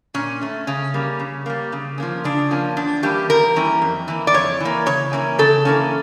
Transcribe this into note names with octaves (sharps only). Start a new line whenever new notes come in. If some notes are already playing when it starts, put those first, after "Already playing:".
A#2 C#4
A3 C#4
C#3 C#4
G3 A#3
C#3
G3 A#3
C#3
F3 A#3 C#4
C#3 D4
F3 A#3 C#4
E2 D4
E3 G3 A#3 C#4 G4
E2 A#4
E3 G3 A#3 C#4
F2
E3 A#3
D5
F2 C#5
E3 A#3
C#3 C#5
E3 A#3 C#4
C#3 A4
E3 A#3 C#4